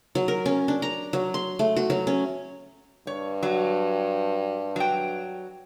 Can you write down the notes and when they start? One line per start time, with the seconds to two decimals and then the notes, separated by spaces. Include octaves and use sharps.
0.15 F#3
0.28 A#4
0.46 C#4
0.68 D4
0.82 A#5
1.13 F#3
1.34 C6
1.59 A3
1.76 F#4
1.90 F#3
2.07 C#4
3.07 G2 C#5
3.43 F#3
4.76 F#3 G5